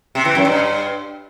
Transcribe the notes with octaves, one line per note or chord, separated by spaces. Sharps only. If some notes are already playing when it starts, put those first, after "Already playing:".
C3
E3
F#2
G2